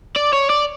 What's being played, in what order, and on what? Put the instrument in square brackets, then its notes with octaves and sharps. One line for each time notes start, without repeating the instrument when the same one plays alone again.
[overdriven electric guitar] D5
C#5
D5